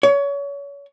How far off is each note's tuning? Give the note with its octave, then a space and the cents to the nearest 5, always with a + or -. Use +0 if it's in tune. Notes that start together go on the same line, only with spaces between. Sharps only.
C#5 +30